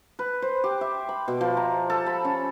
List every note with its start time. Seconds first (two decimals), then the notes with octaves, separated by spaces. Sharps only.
0.19 B4
0.42 C5
0.64 G4
0.81 E5
1.09 B5
1.28 B2
1.41 F3
1.57 A#5
1.90 A4
2.06 B5
2.25 C#4